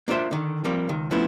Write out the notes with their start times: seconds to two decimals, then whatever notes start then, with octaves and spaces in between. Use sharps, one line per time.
0.08 A#3 D4 F4 C5 E5
0.31 D3 D#3
0.64 F3 G3 A#3 C4
0.89 C#2 D#3
1.11 F3 A3 B3 C#4 E4